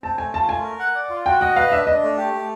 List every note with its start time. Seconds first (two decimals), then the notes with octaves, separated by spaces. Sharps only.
0.03 C4 A5
0.18 A3 G#5
0.34 F4 A5
0.49 A3 G#5
0.64 A#4
0.79 F#5
0.95 D5
1.10 F4
1.26 F#4 G5
1.41 D#5 F#5
1.56 B4 F5
1.72 D4 E5
1.87 D4 D#5
2.03 A3
2.17 G4
2.33 A3